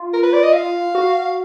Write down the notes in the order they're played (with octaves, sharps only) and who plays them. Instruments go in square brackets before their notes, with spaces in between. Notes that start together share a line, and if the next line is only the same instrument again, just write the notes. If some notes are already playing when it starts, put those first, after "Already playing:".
Already playing: [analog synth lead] F4
[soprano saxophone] A#4
B4
D5
D#5
F5
[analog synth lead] F#4